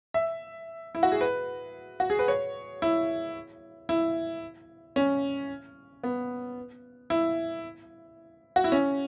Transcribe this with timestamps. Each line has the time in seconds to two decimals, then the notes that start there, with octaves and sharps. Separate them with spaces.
0.14 E5
0.95 E4
1.03 F#4
1.12 G#4
1.21 B4
2.00 F#4
2.10 G#4
2.19 B4
2.28 C#5
2.82 E4
3.89 E4
4.96 C#4
6.03 B3
7.10 E4
8.56 F#4
8.64 E4
8.72 C#4